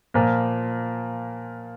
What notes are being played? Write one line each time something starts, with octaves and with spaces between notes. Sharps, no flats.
A#2 F3 A#3